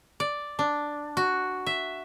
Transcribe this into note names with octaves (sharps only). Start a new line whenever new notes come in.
D5
D4
F#4
E5